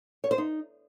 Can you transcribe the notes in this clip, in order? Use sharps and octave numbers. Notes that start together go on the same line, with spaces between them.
C#5
C5
D#4